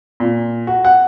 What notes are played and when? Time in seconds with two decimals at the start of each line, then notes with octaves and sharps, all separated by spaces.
0.20 A#2
0.67 F#4
0.85 F#5